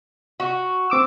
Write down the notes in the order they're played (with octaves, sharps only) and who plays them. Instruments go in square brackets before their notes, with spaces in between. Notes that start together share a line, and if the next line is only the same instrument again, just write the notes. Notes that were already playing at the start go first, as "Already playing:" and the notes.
[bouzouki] F#4
[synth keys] C4 D6 E6